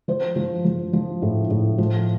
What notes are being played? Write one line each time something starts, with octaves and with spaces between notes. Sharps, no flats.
F3 C5
F3
F3
F3
A2
A2
F3